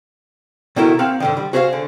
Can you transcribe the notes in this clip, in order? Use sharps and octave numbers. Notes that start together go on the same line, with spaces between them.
B2 D#3 A3 E4 F#4 A#4
A#3 C4 F5 F#5
G#2 D3 D#3
G3
F#4 G#4 C5 E5 F5
D3